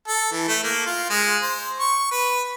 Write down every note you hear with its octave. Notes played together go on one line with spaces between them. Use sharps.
A4
E3
A3
A#3
F4
G#3
C5
C#6
B4